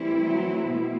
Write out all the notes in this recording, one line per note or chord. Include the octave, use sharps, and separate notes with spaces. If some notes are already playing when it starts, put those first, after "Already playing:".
Already playing: E3 G3 A3 C4 E4
F#3
B2